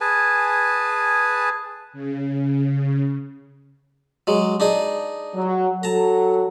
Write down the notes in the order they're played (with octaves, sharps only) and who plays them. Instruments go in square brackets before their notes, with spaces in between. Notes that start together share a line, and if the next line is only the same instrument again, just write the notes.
[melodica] G#4 B4 G#5 A5
[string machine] C#3
[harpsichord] F#3 G#3
D4 D#4 G#4
[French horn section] F#3
[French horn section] F#3 A4 [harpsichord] A5 A#5